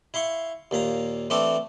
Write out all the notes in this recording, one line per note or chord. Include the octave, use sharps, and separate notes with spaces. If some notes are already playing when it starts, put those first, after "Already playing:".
E4 F5 C6 C#6
D#2 A#2 F5 A#5
E3 A3 C4 D4 A4 D5